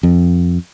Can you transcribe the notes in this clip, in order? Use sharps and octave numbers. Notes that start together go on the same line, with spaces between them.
F2